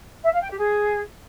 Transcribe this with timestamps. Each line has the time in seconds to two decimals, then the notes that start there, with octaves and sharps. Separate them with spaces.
0.23 E5
0.31 F5
0.40 G5
0.49 G4
0.57 G#4